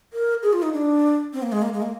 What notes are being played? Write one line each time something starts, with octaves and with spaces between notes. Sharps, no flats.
A#4
G#4
F4
D#4
D4
C4
A#3
G#3
A#3
G#3
A#3